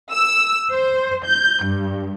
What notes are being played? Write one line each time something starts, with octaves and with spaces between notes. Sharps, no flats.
E6
C5
G6
G2